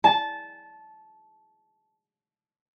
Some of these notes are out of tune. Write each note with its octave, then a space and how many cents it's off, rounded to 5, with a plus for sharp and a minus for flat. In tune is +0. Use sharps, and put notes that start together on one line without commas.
A5 -15